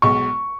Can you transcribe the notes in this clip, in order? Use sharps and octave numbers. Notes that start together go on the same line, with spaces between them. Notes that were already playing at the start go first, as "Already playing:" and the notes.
B1 B2 G#3 C#6